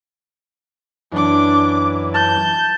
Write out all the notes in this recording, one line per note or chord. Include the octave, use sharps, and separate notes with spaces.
F#2 E3 D4 D6
A5 G6